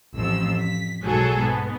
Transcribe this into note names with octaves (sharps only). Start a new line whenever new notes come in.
A1 F2 F3 E6
B6
B1 G#2 F#3 G#4 A4
G#2 B3